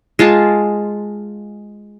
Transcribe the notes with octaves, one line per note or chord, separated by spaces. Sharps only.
G#3 F4 A5